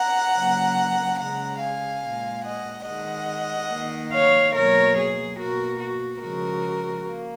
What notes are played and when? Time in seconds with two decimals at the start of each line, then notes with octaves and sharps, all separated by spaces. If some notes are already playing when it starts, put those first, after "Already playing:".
Already playing: F#5 A#5
0.35 C#3 F#3 A#3
1.19 C#3 G#3 F#5 A#5
1.61 F5 G#5
2.03 A#2 G#3
2.44 D#5 F#5
2.86 D#3 G#3 D#5 F#5
3.71 D#3 A#3
4.12 C#5 F5
4.54 B2 F#3 A#3 A#4 C#5
4.97 G#4
5.38 B2 A#3 F#4 A#4
5.80 F#4
6.22 C#3 F3 G#3 F#4 A#4
7.06 A#3